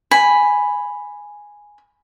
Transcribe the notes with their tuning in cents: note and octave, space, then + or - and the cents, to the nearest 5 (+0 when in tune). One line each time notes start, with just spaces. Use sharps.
G#5 +0 B5 +0